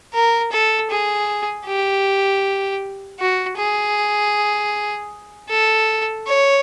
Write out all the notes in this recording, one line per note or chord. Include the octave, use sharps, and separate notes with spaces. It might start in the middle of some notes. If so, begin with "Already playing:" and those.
A#4
A4
G#4
G4
F#4
G#4
A4
C#5